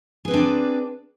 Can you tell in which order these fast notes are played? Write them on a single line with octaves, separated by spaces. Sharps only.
G#4 B4 C4 D4 D5